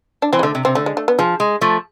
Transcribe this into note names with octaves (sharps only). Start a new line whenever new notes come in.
D4
E3 C4
G#3
D3 A3
C3
C3 C4
D3 A3
G#3
A3
B3
F3 G#4
G#3
F3 A3